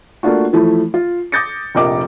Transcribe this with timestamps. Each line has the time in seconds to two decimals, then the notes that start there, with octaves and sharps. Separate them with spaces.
0.23 A3 A#3 D4 F4 F#4
0.53 E3 F3 A3 E4
0.94 F4
1.32 D6 D#6 G6 A6 A#6 C#7
1.75 F1 A#1 A#4 D#5 D6